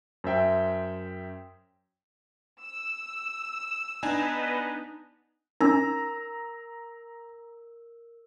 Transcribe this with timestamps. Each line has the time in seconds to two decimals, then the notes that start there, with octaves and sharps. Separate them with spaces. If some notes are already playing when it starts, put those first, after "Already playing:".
0.24 F#2 C5 E5 G5
2.63 E6
4.03 B3 D4 D#4 B4 D#5 G#5
5.61 C#4 D#4 A#4 A#5 E6